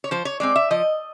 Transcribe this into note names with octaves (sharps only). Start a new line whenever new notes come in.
C#5
F3 C5
C#5
G#3 C4 D5
E5
F3 D#5